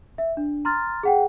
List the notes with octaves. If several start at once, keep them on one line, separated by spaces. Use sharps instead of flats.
E5
D4
A#5 C6 F6 A6
G#4 F#5 G5